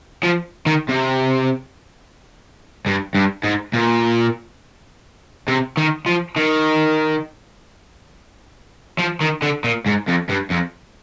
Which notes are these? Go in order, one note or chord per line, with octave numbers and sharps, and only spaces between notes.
F3
D#3
C3
G2
G2
G#2
A#2
C3
D#3
F3
D#3
F3
D#3
D3
A#2
G#2
F2
G2
F2